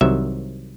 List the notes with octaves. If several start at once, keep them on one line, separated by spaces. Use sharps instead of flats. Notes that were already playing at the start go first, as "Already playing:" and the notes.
C2 C3 D#3 F#3 E5